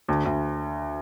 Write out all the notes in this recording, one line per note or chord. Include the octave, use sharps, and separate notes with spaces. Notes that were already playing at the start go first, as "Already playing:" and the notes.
D2
D2